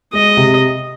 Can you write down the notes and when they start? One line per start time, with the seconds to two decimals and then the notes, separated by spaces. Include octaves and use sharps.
0.13 G#3 D#5
0.37 C3